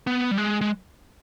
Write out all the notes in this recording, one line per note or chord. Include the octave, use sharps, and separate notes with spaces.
B3
G3
G#3
G#3